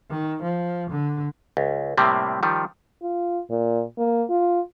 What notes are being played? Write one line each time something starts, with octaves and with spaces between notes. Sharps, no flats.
D#3
F3
D3
C#2
A2 C3 G3 A#3 C4
D#3 F3 G3
F4
A#2
A#3
F4